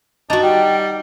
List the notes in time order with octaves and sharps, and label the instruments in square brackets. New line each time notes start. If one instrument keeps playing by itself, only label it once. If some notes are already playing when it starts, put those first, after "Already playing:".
[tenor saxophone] D4 [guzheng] D#4 F#4
[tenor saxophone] G3 [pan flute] G5